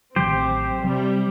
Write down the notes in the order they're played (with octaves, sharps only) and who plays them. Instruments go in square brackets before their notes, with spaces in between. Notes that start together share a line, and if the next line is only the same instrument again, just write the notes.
[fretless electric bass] A1 D#3 F#3 [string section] C4 [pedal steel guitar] G4 C5
[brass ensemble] C3 [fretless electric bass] F#3 [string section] G3